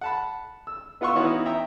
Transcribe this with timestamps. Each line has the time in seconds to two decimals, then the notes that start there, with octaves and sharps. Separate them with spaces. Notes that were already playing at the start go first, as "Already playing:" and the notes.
0.01 F#5 A5 B5
0.67 E6
1.01 B3 F4 F#5 C6 C#6 E6
1.15 E3 B3 C#4 D#4 E4 F#4
1.46 E5 G5 A#5